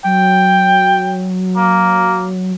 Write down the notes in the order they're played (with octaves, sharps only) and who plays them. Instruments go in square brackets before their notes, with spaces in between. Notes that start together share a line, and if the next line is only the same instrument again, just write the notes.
[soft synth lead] F#3 [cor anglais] G5
[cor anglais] A#3